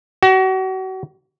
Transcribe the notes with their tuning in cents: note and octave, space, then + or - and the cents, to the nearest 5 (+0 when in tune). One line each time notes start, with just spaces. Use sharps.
F#4 +35